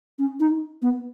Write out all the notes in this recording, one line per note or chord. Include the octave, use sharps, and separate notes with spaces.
C#4
D#4
B3